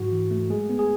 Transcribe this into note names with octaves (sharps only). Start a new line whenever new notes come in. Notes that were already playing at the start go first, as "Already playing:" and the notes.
Already playing: G#2 F#3 F#4
E3
A3
G#3 G#4
B3
G#4